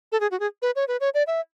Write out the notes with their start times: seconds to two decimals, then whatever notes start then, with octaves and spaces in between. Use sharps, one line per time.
0.12 A4
0.20 G#4
0.31 F#4
0.40 G#4
0.62 B4
0.76 C#5
0.88 B4
1.01 C#5
1.14 D5
1.27 E5